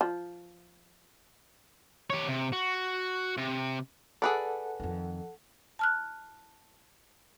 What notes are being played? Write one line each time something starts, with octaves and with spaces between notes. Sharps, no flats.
F3
G4 C#5
C3
F#4
C3
G#4 A4 B4 D5 F#5
F2 D#3
A5 F6 F#6